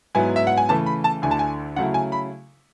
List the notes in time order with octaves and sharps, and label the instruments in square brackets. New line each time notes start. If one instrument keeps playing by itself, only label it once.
[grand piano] G#2 F#3 B3 E4 G#5
E5
F#5
G#5
C#3 E3 A3 E4 A5
B5
A5
D2 D3 A3 E4 G#5
A5
G#5
C#3 F#3 A3 E4 F#5
G#5
B5